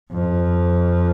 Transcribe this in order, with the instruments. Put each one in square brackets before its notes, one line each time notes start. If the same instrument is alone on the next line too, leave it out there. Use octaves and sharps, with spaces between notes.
[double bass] F2